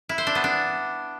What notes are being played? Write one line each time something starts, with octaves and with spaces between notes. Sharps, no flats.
E4
C5
D4
B3
D4